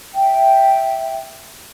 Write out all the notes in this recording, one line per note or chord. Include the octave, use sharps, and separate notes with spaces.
E5 G5